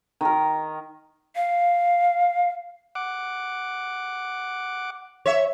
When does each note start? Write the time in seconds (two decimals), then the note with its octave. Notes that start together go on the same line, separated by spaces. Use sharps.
0.21 D#3 A#4
1.36 F5
2.95 F#5 D6
5.26 C#5 E5